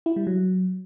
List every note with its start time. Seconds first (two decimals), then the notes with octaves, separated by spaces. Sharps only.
0.06 E4
0.16 G3
0.27 F#3